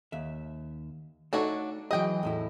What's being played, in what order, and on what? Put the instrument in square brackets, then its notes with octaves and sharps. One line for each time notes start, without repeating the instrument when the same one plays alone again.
[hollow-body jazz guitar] D#2 E5
[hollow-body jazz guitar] A3 D#4 A4 [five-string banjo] D4 F#4 C#5
[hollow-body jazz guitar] E3 F#3 G#4 [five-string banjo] D#5 G5
[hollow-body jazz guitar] E2 A2 E4